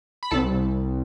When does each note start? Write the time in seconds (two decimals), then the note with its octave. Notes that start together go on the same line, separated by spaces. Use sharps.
0.23 B5
0.31 C2 A4 A5